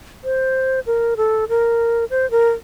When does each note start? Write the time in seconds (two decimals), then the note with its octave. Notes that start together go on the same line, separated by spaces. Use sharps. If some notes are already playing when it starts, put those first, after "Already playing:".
0.24 C5
0.86 A#4
1.17 A4
1.49 A#4
2.10 C5
2.31 A#4